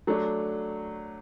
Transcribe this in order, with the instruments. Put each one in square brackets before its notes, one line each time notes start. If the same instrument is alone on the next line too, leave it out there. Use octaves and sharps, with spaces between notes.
[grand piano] F#3 A3 D4